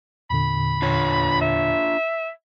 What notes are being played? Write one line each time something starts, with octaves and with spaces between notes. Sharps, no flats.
E2 A#2 D3 B5
D4 F4 C#5
E5